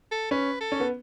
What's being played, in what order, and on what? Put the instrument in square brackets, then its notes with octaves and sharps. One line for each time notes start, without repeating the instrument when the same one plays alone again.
[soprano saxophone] A4
[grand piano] C#4 [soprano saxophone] B4
[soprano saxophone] A4
[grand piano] C#4
B3